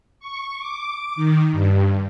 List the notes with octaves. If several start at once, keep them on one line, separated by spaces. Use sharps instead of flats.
C#6
D6
D#3
G2